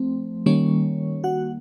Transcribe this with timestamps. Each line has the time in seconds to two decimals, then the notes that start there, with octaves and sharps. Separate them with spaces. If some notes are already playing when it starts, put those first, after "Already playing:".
Already playing: F3 A3 C4
0.46 D#3 G3 A#3 C#4 C#5
1.24 F#4 F#5